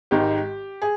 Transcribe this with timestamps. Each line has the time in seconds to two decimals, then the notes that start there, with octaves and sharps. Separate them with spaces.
0.11 G#1 G#2 D#3 G4
0.82 G#4